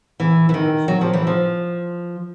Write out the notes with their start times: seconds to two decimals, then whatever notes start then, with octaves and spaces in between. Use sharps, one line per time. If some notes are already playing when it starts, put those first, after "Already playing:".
0.20 E3
0.49 E3
0.54 D#3
0.88 F#3
1.01 F3
1.13 E3
1.27 F3